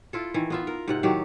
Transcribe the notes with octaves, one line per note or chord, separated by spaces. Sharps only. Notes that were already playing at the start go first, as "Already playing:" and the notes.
E4 F4 A4
D#3 E3
B3 F4 E5
A#4
G#2 C3 F#5
A2 D#3 F#3 G4